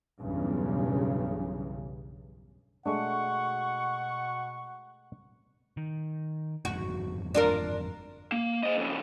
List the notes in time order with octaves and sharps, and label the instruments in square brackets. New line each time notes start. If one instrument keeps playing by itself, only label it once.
[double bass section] B1 E2 G2 C#3
[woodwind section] B2 C#6 [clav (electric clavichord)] G#3 A3 D4 [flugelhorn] F#5
[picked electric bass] D#3
[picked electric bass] G1 F2 G#2 [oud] F#4
[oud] D4 F4 A#4
[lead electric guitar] A#3
C5 D#5
F2 C#3